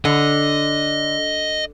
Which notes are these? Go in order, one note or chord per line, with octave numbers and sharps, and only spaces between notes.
D3 D#5